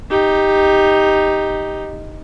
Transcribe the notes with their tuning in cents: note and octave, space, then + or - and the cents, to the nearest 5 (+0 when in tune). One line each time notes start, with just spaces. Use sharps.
D#4 +0 G4 +10